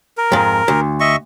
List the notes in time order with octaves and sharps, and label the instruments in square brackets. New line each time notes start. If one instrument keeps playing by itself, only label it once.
[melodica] A#4
[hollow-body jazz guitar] F2 G#2
D2
[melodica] D#5 E5 C#6